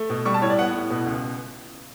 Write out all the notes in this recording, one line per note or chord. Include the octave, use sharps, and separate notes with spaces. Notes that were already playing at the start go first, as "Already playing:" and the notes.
Already playing: A3
B2
G3 C#6
A5
A2 C#5
D5
B3 F#5
A2
B2
C#2